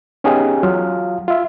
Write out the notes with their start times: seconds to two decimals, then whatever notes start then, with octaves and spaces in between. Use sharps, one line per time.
0.24 B3 C#4 D#4 G4 G#4 G#5
0.63 F#3 F4 F5
1.28 F4 E5